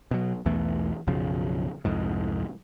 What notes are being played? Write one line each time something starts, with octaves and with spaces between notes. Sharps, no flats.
B2 F#3
B1 E2 E3 A3
B1 F#2 C#3 F3
C2 F2 G#2